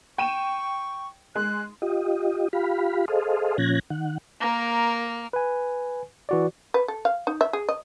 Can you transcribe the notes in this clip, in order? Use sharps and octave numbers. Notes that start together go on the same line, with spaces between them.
G5 C#6 D#7 E7
G#3 F#6
F4 G4 D#5
F4 G4 F5 B5
G#4 A4 C5 D#5 F5
A#2 F3 C#4 F#6 G#6 A#6
D#3 F#5
A#3 A#4
B4 G#5
E3 F#4 D5
B4
A4
F5
D#4
E5
G#4
D#5